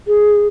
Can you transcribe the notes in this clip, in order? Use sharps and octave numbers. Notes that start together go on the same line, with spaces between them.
G#4